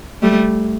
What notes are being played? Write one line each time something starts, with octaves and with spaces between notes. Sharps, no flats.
G3 A3